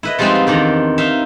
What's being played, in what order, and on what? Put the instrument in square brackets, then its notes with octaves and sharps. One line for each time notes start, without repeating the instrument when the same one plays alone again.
[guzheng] E4 B4 D#5
F3 G3 G#3 B3 C4 D#4
F3
E2 D#3 D4 A#5
D#4 E5 F5